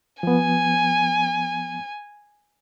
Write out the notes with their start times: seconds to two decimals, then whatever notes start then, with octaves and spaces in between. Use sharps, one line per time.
0.23 F3 B3 G#5